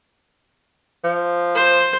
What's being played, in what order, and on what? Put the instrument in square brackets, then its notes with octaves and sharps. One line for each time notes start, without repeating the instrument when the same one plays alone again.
[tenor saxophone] F3
[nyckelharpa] C5